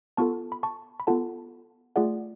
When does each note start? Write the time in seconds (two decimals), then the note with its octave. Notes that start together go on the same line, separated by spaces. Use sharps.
0.17 B3 F4 A4 A5 C#6
0.52 B5
0.63 A5 C#6
1.00 B5
1.07 B3 F4 A4 F#5 A5
1.96 A3 F4 G#4 D5 F#5